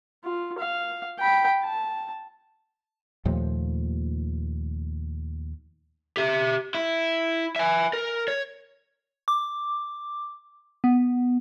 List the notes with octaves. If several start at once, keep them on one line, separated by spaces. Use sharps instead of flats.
F4
F5
G5 B5
A5
D#2 A#2 F3 A3
G4 E5
E4
E5 G#5
A#4
C#5
D6
B3